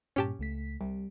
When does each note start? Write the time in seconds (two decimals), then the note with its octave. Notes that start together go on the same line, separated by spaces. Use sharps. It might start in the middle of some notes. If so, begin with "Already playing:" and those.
0.16 G2 A#2 C#4 G4 A5
0.39 C#2 A3 B6
0.81 C2 G3